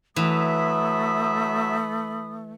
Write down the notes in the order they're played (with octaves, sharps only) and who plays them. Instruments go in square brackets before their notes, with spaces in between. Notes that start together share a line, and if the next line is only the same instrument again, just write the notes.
[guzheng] E3 [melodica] F#3 E5 [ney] A3 [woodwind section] B5 D#6